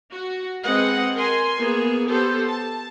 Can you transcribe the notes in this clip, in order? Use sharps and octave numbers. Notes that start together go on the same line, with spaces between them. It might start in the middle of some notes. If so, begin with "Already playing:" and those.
F#4
G#3 C4 G#4 B4 D#5 F#5
A#4 G#5 C6
A#3 B3 G#4
B3 G4 A4 C5
A5